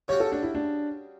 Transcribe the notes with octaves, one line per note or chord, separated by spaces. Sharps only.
C#3 G3 C#4 F#4 C#5
A4
D4
E4
D4